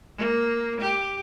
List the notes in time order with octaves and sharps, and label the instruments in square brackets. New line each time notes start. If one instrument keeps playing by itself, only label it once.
[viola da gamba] A#3
G4